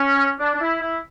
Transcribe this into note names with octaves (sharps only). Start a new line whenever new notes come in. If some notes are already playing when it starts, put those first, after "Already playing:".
Already playing: C#4
D4
D4
E4
E4